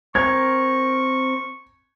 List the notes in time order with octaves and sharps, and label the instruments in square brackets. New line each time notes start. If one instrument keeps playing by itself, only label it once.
[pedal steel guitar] C4 A#4 [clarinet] C#6 [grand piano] G#6